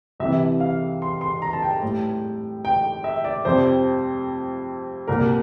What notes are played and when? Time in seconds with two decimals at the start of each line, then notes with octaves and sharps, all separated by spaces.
0.20 C2 C3 E3 G3 E5
0.60 F5
1.02 C6
1.21 C6
1.42 A#5
1.53 A5
1.62 G5
1.82 A2 G3
2.65 G5
3.04 E5
3.24 D5
3.45 F2 C3 G3 C5
5.08 C2 A#2 G3 A#4